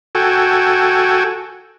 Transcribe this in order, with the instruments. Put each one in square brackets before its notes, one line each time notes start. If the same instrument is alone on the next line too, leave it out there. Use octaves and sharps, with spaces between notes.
[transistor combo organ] F#4 A4 G5 G#5